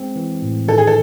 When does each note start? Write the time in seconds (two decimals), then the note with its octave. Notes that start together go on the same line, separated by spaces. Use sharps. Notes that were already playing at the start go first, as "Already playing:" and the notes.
Already playing: G#3 C4
0.16 E3
0.42 A2
0.68 D#3 A4
0.78 G#4
0.87 A4